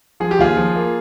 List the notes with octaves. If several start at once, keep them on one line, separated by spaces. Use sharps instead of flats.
F3 G#4
G4
D#2 F4 G#4
F3
A#3